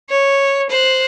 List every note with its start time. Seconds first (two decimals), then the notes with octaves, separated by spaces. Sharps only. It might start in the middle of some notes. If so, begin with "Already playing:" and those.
0.10 C#5
0.70 C5 F#6